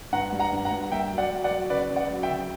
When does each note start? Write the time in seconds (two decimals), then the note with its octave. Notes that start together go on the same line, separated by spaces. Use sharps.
0.13 G2 F#5 A#5
0.33 G3
0.39 F#5 A#5
0.53 G2
0.65 F#5 A#5
0.72 G3
0.92 A#3 E5 G5
1.11 F#3
1.18 D5 F#5
1.31 F#3
1.44 D5 F#5
1.51 F#3
1.70 C#3 B4 D5
1.90 C#3
1.96 D5 F#5
2.10 F#3
2.23 E5 G5
2.30 C#3